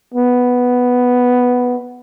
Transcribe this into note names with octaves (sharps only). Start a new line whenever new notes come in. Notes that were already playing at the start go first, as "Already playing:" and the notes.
B3